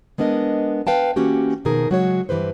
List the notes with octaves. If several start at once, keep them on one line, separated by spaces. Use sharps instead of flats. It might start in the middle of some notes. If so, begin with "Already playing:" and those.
G#3 B3 D4 A#4 D#5
B4 F5 G5 A5
E3 A#3 C#4 F#4 G4
B2 D#3 F3 D#4 G#4 A#4
C#3 F#3 G#3 F#4 C5 C#5
G2 E3 G4 B4 C5